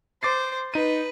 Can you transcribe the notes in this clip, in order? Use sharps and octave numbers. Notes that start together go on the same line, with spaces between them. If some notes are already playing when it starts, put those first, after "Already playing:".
C5 D6 A6 C7
D#4 B4 D#7